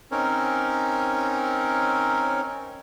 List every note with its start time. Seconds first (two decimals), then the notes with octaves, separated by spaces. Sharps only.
0.11 C4 C#4 D#4 A#4 C#5